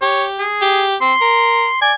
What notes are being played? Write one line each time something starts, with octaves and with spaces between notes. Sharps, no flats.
G4 C#5
G#4
G4
C4 C6
A#4
D5 G#5